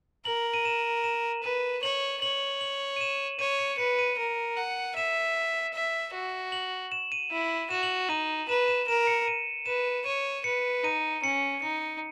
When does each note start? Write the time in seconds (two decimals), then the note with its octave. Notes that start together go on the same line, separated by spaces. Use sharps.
0.25 A#4 F#7
0.54 D#7
0.65 E7
1.04 E7
1.44 B4 D#7
1.83 C#5 F#7
2.22 C#5 F#7
2.61 F#7
2.96 D#7
3.01 E7
3.39 C#5 D#7
3.59 C#7
3.78 B4 C#7
3.99 D#7
4.18 A#4
4.57 F#5
4.96 E5 E7
5.74 E5
6.14 F#4
6.52 F#7
6.92 E7
7.12 D#7
7.31 E4
7.70 F#4 E7
7.83 F#7
8.09 D#4 D#7
8.49 B4 E7
8.68 E7
8.88 A#4 E7
9.07 C#7
9.27 D#7
9.66 B4 E7
10.06 C#5 D#7
10.44 B4 C#7
10.84 D#4 D#7
11.23 C#4 C#7
11.62 D#4 C#7